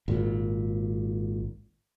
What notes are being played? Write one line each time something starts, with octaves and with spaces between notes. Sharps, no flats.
G#1 A#2